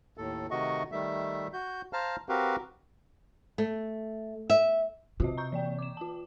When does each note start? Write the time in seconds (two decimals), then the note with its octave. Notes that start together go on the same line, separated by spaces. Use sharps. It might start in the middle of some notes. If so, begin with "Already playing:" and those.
0.18 D#2 A2 A4
0.51 C3 D#3 A3 F#4 D#5 C#6
0.92 D#3 G3 A3 E5
1.53 F#4 G6
1.93 C5 F5 A5 A#5 F6
2.29 C4 F#4 G4 A#4 B4 F5
3.58 A3
4.50 E5
5.20 C3 F4 F#4 D#5
5.38 A#5 C#6 G6
5.52 E3 D5 G5
5.79 D6 E7
5.97 F4 A5